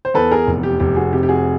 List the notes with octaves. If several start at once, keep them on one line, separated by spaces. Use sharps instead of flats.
C5
E2 A4 B4
G#4 A#4
F1
G4
F1 G4
F#4 G#4
C3 G4
G4
F#4 G#4